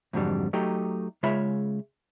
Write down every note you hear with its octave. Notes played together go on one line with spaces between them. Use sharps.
F2 G#2 D3 F#3 G3
F#3 A3 D#4 G4
C#3 G#3 F4 C#5 E5 B5